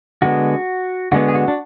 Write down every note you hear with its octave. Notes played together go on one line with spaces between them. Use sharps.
D3 G#3 B3 F#4
D3 G#3 B3 F#4
G#4
F#4
D4